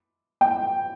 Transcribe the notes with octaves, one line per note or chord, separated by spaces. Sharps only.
G5